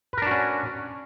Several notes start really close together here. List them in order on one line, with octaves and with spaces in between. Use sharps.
B4 A#4 D4 F#4 C#4